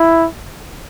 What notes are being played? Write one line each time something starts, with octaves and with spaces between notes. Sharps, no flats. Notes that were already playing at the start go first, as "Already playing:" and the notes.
Already playing: E4